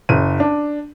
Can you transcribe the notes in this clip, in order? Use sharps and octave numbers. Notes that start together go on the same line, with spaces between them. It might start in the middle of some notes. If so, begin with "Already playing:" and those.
F#1 D#7
D4